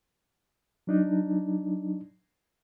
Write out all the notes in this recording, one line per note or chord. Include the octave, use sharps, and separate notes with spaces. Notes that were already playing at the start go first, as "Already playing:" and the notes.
F#3 D4 D#4